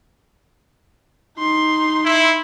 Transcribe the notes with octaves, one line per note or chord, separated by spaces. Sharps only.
D#4 C6
E4